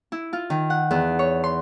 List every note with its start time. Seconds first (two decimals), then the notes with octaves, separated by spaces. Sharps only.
0.12 E4
0.33 F4
0.50 D#3
0.70 F#5
0.91 E2
1.19 C#5
1.44 C6